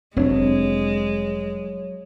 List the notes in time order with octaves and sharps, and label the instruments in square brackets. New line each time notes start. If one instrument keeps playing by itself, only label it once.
[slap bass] F1 [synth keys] F#3 C#5 [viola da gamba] G#3 [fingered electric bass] C4 D4